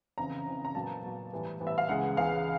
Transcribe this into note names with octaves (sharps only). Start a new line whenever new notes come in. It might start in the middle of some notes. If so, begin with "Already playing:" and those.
F2 C#3 E3 A#5
F2 C#3 E3
A#5
A#2 F#3 B3 A5
A#2 F#3 B3
A2 E3 G3 B3
A2 E3 G3 B3
E5
F5
C#2 C#3 E3 G#3 F#5
C#2 C#3 E3 G#3 F5